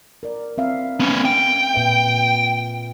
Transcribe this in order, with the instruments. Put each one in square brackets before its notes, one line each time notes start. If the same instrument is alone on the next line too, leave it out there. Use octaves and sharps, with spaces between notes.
[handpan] A#4 D5
C4 E5 F5
[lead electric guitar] B3 C#4
G5
[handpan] A#2 B4 E5